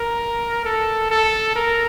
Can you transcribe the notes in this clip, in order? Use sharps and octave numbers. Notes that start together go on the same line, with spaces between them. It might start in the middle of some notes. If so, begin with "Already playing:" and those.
Already playing: A#4
A4
A4
A#4